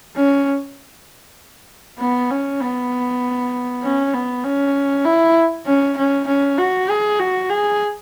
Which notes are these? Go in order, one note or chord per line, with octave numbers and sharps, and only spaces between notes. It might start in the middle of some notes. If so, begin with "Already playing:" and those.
C#4
B3
C#4
B3
C#4
B3
C#4
E4
C#4
C#4
C#4
F#4
G#4
F#4
G#4